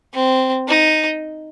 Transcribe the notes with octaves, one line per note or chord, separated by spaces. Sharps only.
C4
D#4